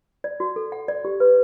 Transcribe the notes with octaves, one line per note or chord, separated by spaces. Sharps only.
D5
F#4
A4
F#5
D5
G4
B4